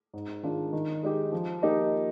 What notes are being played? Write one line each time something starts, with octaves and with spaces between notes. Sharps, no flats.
G#2
D#3 G#3 D4 F4
D#3
G#3 D#4 G4
F3
A#3 D#4 G4